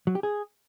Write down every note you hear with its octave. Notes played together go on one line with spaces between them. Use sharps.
F#3
G4
G#4